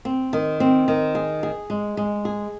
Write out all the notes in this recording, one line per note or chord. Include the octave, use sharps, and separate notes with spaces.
C4
D#3
C4
D#3
G#4
G#4
G#3
G#3
G#4